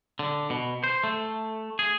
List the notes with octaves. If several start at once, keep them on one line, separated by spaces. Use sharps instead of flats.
D3
B2
C5
A3
G#4